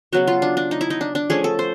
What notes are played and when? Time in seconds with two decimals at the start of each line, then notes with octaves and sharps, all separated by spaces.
0.13 C#3 F#3 B3 F#4
0.27 F4
0.42 D4
0.57 D4
0.71 D#4
0.81 E4
0.90 D#4
1.01 D4
1.15 D4
1.30 F3 A3 C#4 G#4
1.44 A4
1.59 C5